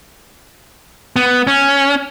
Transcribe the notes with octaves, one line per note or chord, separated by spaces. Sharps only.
B3
C#4